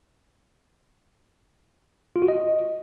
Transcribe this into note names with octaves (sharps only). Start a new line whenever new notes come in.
F4
F#4
D#5